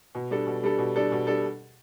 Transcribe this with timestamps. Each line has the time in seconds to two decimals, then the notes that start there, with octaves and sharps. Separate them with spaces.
0.15 B2
0.31 G3 D4 A4
0.47 B2
0.63 G3 D4 A4
0.78 B2
0.96 G3 D4 A4
1.12 B2
1.27 G3 D4 A4